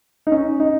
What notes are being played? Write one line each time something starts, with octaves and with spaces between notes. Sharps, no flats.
D#4
C#4
D#4